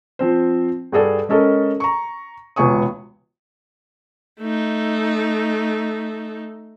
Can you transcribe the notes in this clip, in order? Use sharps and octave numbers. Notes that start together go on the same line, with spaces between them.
F3 C4 C5
G2 F#4 G#4 A4 D5
G#3 C#4 A4 A#4 D#5
A#5 C#6
E1 C#2 B3 G#5 C#6 D#6
A3 D#4